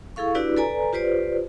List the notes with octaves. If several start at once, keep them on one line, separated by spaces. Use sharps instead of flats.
E4 G#4 A4 F5 C#6
D4 E4 F#4 G4 B4 D5
A4 B4 D5 G#5 A#5
F4 G4 B4 C5 D5